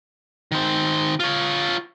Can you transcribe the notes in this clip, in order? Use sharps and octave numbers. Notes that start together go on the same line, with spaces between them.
D#3 C5
F4 C#5